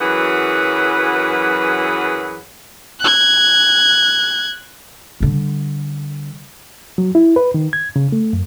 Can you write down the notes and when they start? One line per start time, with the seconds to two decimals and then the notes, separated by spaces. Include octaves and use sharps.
0.01 F#2 E3 F#3 G#4 B4 F#5
3.00 F#6 G#6
5.20 D3 G3
6.98 F#3
7.15 E4
7.36 B4
7.54 D#3
7.73 G#6
7.96 C#3
8.12 A3
8.33 F#2